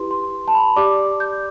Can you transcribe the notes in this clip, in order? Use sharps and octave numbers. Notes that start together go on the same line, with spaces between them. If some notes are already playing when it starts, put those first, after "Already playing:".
Already playing: E4 G4 B4 C6
C6
A5
B5
G4 D5 D6
G6